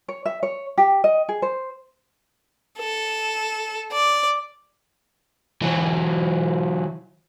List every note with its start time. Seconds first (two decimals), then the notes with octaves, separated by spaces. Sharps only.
0.08 C#5
0.26 E5
0.43 C#5
0.78 G4
1.04 D#5
1.29 G#4
1.42 C5
2.78 A4
3.92 D5
5.62 E3 F#3